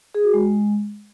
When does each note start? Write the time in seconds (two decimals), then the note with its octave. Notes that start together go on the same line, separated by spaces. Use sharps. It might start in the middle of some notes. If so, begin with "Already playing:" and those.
0.15 G#4
0.24 F#4
0.34 G#3